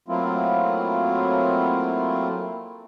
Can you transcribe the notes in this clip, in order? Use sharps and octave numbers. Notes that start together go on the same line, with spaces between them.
F#3 A3 A#3 C4 E4 F4